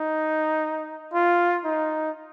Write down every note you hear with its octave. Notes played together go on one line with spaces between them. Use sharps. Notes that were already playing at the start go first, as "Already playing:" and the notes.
Already playing: D#4
F4
D#4